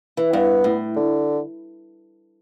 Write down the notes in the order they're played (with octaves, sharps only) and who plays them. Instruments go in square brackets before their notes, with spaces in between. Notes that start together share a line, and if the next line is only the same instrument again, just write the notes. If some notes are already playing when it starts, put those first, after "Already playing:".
[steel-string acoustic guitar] E3
[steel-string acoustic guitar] G2 [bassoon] B3
[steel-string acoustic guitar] A2
[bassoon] D3